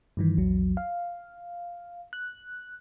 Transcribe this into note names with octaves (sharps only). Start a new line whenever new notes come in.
G2 D#3 E3
A#1 E2 F#3
F5
F#6